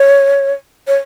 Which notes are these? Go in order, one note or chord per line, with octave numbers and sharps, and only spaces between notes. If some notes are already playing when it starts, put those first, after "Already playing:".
Already playing: C#5
C#5